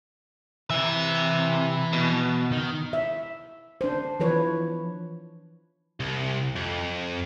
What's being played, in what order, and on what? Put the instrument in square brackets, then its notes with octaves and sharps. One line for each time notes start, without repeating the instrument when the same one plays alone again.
[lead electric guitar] C3 E5 [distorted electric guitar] E3
[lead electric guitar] B2
[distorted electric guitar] D#3
[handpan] E5
D4 C5
E3 F3 B4 C#5
[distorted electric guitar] C2
F2